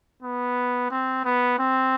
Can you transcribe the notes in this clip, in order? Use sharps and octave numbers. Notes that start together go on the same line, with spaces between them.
B3
C4
B3
C4